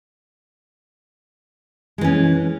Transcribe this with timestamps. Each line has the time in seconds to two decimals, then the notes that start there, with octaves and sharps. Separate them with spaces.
1.98 G#3
2.01 E3
2.04 C#4